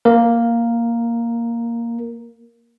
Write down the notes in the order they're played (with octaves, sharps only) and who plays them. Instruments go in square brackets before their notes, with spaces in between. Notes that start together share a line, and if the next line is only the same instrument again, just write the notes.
[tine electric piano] A#3 A#4